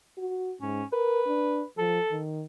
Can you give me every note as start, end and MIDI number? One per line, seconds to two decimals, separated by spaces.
0.18 0.53 66
0.61 0.82 44
0.61 0.85 61
0.93 1.22 70
0.93 1.66 71
1.27 1.63 62
1.78 1.99 53
1.78 2.19 69
2.12 2.44 51